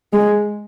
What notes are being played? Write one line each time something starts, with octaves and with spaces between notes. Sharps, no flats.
G#3